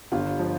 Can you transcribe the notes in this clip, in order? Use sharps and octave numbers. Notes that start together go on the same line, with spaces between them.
G1 F4
F3